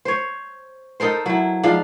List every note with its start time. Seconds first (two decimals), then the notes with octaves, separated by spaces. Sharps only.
0.05 C5 C#5
1.00 D#4 A4 A#4 C5
1.26 F#3 E4
1.63 G#2 F3 D4 F5